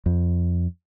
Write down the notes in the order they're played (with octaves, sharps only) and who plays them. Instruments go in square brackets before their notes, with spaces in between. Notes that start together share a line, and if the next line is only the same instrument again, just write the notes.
[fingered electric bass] F2